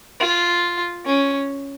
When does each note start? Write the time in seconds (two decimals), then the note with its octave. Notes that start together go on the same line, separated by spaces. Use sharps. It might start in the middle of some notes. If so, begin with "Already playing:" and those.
0.20 F4
1.06 C#4